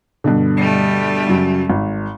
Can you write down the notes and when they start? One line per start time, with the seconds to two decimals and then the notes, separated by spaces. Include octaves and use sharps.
0.24 G2 B2 D3
0.58 G3 A3
1.27 F#2 C#3 F#3
1.70 G#1